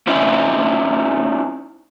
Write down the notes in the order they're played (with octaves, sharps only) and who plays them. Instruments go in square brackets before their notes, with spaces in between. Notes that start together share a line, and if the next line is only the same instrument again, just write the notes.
[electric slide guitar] C4 C#4 D#4 E4